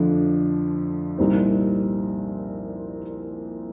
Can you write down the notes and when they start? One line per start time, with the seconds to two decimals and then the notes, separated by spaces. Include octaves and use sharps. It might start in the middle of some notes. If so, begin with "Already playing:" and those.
Already playing: F2 D3 F3 A3 D4
1.18 C2 A#2 G3 C4 D#4